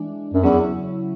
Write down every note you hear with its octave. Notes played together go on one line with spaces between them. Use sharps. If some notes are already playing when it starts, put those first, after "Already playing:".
Already playing: E3 G#3 D4
F#2
E2 C#3 F#3 C#4 E4